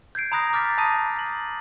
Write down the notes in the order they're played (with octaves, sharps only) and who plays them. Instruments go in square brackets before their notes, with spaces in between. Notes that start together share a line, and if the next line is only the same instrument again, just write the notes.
[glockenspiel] G6 G#6 C7 D7
A#5 B5 D#6 F#6 A#6
D6 F6 G6 A6 B6
A5 B5 D#6 A#6 D#7
F#7